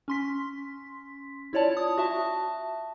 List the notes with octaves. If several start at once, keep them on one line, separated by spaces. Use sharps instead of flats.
C#4 C6 B6
E4 F4 C#5 D5 A5
D#6
F#4 E5 A5